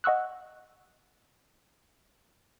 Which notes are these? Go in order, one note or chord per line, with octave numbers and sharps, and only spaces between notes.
D#5 F#5 C#6 E6 F#6